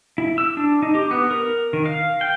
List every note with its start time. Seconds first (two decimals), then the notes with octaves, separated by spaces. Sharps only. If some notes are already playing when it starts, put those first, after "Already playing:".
0.18 E4
0.38 E6
0.57 D4
0.82 D#4
0.95 G4
1.11 B3
1.31 A#4
1.73 D#3
1.86 F5
2.21 G5